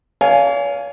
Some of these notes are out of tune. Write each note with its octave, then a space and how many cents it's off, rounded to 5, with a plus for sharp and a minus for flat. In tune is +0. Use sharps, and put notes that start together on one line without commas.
C#5 +45 F5 +0 G#5 +0